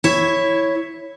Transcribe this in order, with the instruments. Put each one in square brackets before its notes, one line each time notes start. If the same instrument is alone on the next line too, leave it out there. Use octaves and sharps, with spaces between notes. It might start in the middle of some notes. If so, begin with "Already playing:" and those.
[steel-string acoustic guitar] E4 C#5